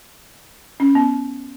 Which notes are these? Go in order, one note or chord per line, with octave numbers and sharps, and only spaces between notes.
C#4
B3